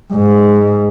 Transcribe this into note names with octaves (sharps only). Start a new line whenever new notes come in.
G#2